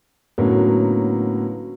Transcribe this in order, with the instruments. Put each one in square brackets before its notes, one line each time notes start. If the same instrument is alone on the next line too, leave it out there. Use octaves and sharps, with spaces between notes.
[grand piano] A2 D3 F#3 A#3 B3 C#4